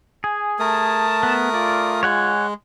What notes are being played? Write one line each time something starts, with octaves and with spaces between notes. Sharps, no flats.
G#4 G#5
A3 A#4 A5 D#6
B3
F4 D5
G#3 C#5 F#5 G#5